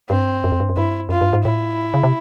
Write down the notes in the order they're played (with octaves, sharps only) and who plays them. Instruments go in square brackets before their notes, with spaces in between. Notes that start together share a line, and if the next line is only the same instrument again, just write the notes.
[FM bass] G2 [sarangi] C4
[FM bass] F#2
F2
G2
F#2
[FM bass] G2 [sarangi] E4
[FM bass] F#2 [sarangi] F4
[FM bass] G2
G#2
[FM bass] A2 [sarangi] E4
[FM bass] C#3
C3